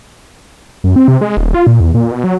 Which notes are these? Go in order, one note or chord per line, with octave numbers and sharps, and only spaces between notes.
F#2
C4
C3
G#3
D#1
F4
A#2
E2
A#2
B2
F#3